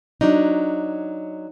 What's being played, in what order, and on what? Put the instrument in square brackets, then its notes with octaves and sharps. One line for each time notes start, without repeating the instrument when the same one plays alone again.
[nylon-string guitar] F#3 D4 D#4